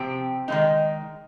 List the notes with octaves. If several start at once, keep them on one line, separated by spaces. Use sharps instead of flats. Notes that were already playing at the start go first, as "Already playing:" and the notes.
Already playing: C3 F3 C4 G4
D#3 G#3 D#4